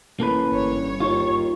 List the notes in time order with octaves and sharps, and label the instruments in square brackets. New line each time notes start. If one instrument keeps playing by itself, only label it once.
[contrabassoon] A1 [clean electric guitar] A#3 A4 B4
[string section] G1 C#5
[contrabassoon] D#2 [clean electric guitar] F4 [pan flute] C#6